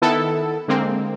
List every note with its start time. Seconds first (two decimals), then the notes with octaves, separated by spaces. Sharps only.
0.02 D#3 B3 E4 A4
0.68 D3 G#3 A#3 C4